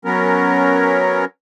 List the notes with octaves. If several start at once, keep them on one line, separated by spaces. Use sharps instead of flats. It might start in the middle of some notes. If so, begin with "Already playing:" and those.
F#3 B3 C#4 A#4